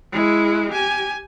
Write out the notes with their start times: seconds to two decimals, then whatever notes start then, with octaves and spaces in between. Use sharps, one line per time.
0.13 G#3 E4
0.71 G4 G#5